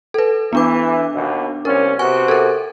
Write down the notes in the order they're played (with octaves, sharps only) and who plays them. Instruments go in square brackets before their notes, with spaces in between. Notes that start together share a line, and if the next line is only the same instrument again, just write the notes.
[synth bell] A4 B4
[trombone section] E3 [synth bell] B3 D4 D6
[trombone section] D#2 B2
[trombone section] C2 C#4 [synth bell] A#4
[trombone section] C3 B3 F#4 [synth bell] G#5 C#6
[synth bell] A4 A#4